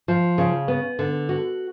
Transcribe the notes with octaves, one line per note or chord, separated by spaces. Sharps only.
F3
C#3
B3
D3
F#4